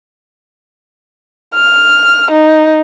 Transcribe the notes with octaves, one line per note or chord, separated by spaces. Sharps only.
F6
D#4